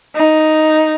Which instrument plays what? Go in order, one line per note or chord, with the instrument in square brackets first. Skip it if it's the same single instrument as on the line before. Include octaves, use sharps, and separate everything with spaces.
[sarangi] D#4